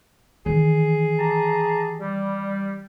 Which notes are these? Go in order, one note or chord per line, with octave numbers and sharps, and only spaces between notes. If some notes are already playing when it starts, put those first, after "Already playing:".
D#3 E3 G#4
G4 A5 A#5
G3